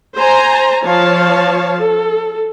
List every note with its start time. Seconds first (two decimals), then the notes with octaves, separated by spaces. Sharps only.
0.16 C5 G#5 A#5
0.84 F3 C#5 F5 A5
1.77 A4